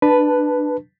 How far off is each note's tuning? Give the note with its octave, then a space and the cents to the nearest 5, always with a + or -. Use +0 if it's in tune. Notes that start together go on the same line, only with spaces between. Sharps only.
D4 +20 B4 +0 A5 +0